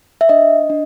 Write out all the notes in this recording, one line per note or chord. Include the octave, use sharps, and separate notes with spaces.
E5
D4 D#5
D4